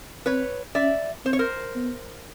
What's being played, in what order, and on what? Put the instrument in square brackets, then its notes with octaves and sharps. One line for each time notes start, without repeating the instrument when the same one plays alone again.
[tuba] C4 [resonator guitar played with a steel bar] B4 C#5
[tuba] C#4 [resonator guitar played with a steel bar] D5 E5
[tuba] C4 [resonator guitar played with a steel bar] C5
[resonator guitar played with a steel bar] C#5
A#4 C5
[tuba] B3